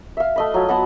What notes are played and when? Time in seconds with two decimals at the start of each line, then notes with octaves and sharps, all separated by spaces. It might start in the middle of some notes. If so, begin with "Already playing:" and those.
0.17 E5 F5
0.36 A3 D#5 B5
0.54 F#3 F4 G#5
0.69 B3 D#5 F#5 A5